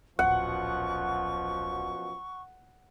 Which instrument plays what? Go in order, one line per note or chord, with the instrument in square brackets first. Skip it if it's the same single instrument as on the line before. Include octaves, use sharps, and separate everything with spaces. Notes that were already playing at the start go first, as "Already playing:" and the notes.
[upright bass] D1 A#1 [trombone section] F#2 B2 F3 [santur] F#5 [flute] C#6